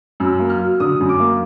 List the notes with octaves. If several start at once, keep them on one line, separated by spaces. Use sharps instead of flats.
F#2 E6
A#3
F6
F#3
D3 D#6
F#2
D6
A#3